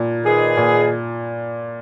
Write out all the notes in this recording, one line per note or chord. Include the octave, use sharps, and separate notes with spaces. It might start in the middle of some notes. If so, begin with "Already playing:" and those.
Already playing: A#2
D#3 A#3 D#4 G#4 B4
A#2